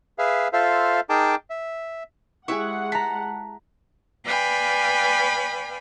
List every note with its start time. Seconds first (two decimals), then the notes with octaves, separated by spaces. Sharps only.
0.19 G#4 B4 E5 F5
0.53 F4 A4 C5 E5 F5
1.09 D#4 G#4 A#4 G5 A5 D6
1.50 E5
2.48 G#3 E4 G4 G#4 C#5 E5 F#5 C#6
2.92 A5 A#5 B6
4.25 B4 D5 F5 G5 G#5 B5